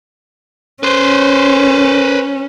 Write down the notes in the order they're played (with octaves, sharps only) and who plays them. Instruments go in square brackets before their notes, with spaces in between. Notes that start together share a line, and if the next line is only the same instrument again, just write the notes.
[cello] C#4 [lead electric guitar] B4 C5